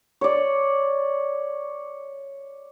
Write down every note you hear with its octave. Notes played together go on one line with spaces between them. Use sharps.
C#5 D5